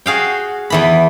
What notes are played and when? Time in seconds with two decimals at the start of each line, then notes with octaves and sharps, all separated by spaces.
0.06 F#4 G#4 F5 G5
0.70 E2 E3 B5